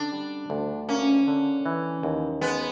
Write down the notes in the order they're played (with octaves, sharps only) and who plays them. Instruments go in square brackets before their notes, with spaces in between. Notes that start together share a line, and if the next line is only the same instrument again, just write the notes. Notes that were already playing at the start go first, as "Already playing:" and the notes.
Already playing: [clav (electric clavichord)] D3 [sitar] D4
[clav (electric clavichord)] G3
D2
[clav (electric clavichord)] A#3 [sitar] C#4
[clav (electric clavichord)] D3
E3
D#2
[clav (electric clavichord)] G#3 [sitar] B3